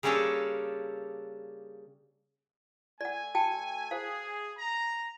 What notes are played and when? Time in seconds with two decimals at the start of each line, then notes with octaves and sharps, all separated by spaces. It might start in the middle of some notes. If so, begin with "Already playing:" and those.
0.03 C#3 G3 A#3 C#4 D4 A4
3.01 A3 D5 F#5 G#5
3.35 F#4 G5 A5
3.91 G#4 C5 F5
4.57 A#5